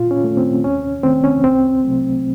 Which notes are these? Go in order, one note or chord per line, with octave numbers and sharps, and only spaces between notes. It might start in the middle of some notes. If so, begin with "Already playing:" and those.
Already playing: A#2 F4
C#4
A3
C4
D#2 C#4
D#3 A3 C4
C#4
C2 C4
C3 F#3 A3